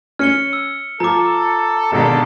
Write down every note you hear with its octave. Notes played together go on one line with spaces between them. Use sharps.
C#4 F6 C#7 G7
E6
F3 A4 A#5 D6
G#1 B2 D3 D#3 A#3 G4 A4